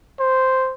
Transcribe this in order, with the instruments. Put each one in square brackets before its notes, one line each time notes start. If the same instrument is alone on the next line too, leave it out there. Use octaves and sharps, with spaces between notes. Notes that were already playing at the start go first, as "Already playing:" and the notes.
[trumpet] C5